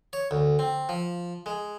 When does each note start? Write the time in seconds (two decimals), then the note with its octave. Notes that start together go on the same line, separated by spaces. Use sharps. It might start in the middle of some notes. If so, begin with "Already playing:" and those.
0.13 C#5
0.31 D2
0.59 C4
0.89 F3
1.46 G#3